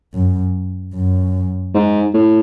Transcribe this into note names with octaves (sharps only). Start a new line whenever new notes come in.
F#2
F#2
G#2
A2